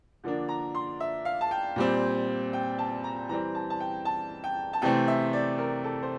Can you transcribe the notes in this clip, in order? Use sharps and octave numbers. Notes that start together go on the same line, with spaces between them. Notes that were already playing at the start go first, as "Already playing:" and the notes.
D3 F3 A#3 D4
A#5
C6
E5
F5
A5
G5
A#2 G3 C4
G5
A5
A#5
E3 G3 C4 A#5
A5
A5
G5
A5
G5
A5
C3 E3 A3 C4 G5
E5
D5
A#4
A4
C5